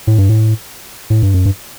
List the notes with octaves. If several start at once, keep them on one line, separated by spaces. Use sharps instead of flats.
A2
G2
A2
A2
G2
F#2
G2